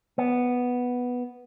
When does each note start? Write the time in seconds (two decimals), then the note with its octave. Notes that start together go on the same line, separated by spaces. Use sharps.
0.18 B3